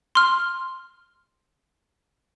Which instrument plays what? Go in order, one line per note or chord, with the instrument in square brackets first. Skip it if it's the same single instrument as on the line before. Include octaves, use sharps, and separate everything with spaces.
[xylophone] C6 F6